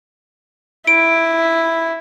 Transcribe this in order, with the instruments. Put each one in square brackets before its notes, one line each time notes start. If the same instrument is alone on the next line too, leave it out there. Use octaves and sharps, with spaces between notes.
[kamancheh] E4 [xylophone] D7